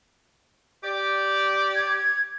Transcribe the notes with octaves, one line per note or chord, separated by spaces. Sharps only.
G4 D5
G#6